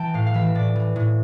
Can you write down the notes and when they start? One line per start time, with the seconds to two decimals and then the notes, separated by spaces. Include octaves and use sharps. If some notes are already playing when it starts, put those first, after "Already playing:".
Already playing: E3 G5 A5
0.14 A2 F5
0.26 F5
0.34 E3 E5
0.55 A2 D5
0.75 E3
0.96 A2